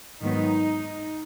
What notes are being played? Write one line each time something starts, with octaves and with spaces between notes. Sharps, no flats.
G#2 D#3 F#3 B3 D#4